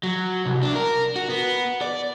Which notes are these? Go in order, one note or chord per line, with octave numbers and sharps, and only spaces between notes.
F#3
C2
D4
A#4
F#4
B3
D5